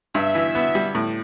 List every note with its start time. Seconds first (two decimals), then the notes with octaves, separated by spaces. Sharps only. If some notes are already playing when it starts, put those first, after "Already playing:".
0.15 G2 E5
0.35 E3
0.55 B3
0.75 G3
0.95 A2